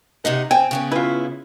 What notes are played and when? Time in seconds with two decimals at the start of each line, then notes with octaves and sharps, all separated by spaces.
0.25 C3 D#4 D#5 F#5
0.51 C4 G5 G#5
0.71 C#3 B3 C#4
0.92 E4 F4 B4